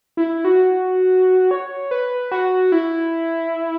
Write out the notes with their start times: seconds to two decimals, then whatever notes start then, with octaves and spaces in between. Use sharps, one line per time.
0.17 E4
0.45 F#4
1.51 C#5
1.91 B4
2.31 F#4
2.72 E4